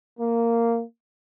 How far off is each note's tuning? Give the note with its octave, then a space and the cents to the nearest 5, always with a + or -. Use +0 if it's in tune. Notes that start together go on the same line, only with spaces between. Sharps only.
A#3 -10